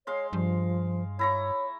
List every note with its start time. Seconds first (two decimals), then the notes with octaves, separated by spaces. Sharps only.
0.07 G#3 C#5 F5 C6
0.33 G2 F3
1.19 E4 C#5 A#5 C#6